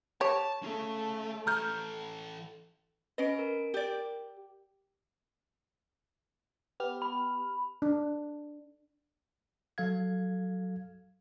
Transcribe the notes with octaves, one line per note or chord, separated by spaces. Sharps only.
G4 C#5 A5
A3 C#4 G#4
E3 A4 A#5 F6 G6
C#4 B4 D#5 D7
A#4
G4 D5
B3 G4 F6
B5
D4
F#3 A4 F5 G#6